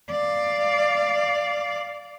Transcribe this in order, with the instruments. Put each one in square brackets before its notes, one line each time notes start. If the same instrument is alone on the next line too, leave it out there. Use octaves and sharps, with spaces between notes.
[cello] D5 F5